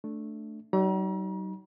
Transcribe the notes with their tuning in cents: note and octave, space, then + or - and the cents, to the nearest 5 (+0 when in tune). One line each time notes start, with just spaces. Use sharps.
A3 +0 D4 +0
F#3 +45 D#4 +0 A#5 +40